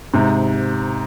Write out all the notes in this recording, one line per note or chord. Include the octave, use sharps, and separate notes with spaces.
G#2 C3